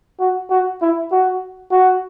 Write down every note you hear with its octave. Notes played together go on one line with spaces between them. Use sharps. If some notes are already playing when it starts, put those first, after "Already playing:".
F#4
F#4
E4
F#4
F#4